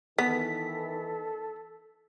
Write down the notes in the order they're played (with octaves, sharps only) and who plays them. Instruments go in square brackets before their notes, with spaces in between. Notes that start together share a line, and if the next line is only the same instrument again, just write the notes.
[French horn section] D#3 E3 [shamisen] B3 [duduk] A4 [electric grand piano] B6